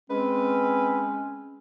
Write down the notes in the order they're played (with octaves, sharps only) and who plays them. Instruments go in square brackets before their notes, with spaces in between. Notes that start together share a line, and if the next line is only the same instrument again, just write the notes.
[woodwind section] G#3 C#4 [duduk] C4 [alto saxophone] B4